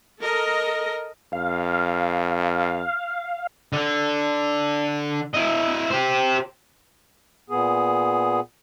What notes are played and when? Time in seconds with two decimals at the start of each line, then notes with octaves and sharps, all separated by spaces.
0.20 A4 A#4 D#5
1.33 F2 F5
3.72 D3
5.34 E4 D#5
5.91 G4 C5
7.50 A#2 B3 G#4